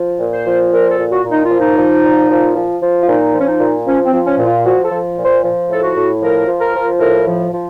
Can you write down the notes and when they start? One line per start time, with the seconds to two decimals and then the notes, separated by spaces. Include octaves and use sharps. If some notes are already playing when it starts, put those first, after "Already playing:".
Already playing: F3
0.19 A#2
0.33 C5
0.45 F3
0.72 A#2 A#4
0.91 A4
0.98 A#2
1.11 F#4
1.24 A#2
1.30 D#4
1.44 F4
1.51 F3
1.58 D#4
1.77 F3
2.03 A#2
2.29 F3
2.56 F3
2.81 F3
3.03 F4
3.07 A#2 D#4
3.33 F3
3.40 C#4
3.47 D#4
3.59 A#2
3.85 F3 C#4
4.05 C4
4.13 F3
4.25 C#4
4.38 A#2
4.45 F4
4.64 F3 F#4
4.84 A4
4.90 F3
5.17 A#2
5.24 C5
5.44 F3
5.69 A2 A4
5.83 F#4
5.96 A2
6.21 F3 A#4
6.47 F3
6.60 A#4
6.74 F3
7.00 A2 A#4
7.26 F3
7.52 F3